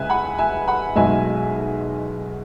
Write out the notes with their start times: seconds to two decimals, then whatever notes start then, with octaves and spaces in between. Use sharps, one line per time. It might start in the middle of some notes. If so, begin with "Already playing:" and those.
Already playing: C#2 C#3 G#3 B4 E5 G#5
0.10 F#5 B5
0.38 E5 G#5
0.68 F#5 B5
0.95 B1 B2 G#3 E5 G#5